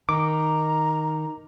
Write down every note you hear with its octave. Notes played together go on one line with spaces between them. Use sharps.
D#3 A#5 D6